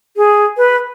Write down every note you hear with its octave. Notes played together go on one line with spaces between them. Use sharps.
G#4
B4